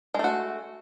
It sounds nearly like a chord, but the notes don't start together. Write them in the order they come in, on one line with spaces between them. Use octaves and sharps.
G#3 A3 F#4